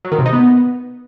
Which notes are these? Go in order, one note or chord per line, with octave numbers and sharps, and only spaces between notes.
F#3
D#3
C3
D#4
B3